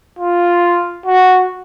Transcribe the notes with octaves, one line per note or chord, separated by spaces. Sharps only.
F4
F#4